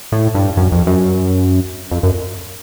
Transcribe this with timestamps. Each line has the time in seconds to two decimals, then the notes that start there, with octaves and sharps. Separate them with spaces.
0.12 A2
0.34 G2
0.57 F#2
0.72 F2
0.87 F#2
1.91 F2
2.03 F#2